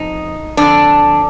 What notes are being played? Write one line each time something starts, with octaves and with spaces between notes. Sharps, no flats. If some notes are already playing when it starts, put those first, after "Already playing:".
Already playing: F2 D#4
F2 D3 D4